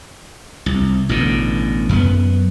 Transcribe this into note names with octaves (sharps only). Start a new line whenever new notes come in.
C2
A1 B2 D3
F#2 B3